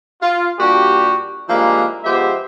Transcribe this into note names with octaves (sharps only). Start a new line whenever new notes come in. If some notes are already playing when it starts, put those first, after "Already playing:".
F4
A#2 G3 D4 F#4 G4
F3 G3 G#3 A#3 D4 E4
F3 G#3 B3 G4 C5 E5